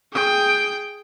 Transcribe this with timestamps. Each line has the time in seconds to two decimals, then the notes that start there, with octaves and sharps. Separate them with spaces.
0.13 G#4 G5